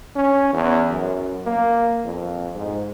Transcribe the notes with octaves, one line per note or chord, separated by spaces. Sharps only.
C#4
E2
F#2
A#3
F2
G#2